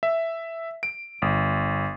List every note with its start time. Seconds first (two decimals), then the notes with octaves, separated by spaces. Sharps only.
0.03 E5
0.83 D7
1.22 G1